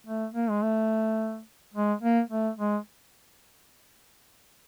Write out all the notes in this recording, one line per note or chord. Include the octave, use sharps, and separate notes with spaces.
A3
A#3
G#3
A3
G#3
A#3
A3
G#3